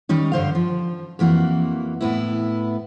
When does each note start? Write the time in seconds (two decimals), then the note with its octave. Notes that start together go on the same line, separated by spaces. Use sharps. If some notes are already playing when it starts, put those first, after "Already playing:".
0.09 D#3 G3 C#4 D#4
0.32 G2 D3 C5 F5
0.55 F3
1.19 F2 E3 A#3 F#4
2.01 A2 B3 E4